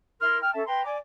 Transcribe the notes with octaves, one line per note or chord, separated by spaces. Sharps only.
E4 A#4 C6 F6
G5 F6
C#4 A4 E5 A5
B4 G5 A#5 C6
D5 G#5 D6